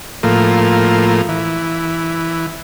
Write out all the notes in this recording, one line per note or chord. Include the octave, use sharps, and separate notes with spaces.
A2 F3 A#3
E3